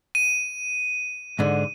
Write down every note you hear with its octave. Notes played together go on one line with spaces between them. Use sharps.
D#7
G#2 D3